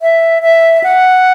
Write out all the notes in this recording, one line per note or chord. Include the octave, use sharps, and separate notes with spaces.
E5
E5
F#5